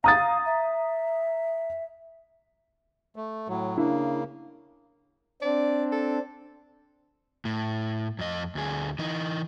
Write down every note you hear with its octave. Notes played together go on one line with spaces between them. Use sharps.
F5 A#5 D#6 A6
E5
A3
A2 F#3
C#3 A#3 D4 E4
C4 D4 D5
A4
A2
F2 D#5
D2 G#4
E3 D#4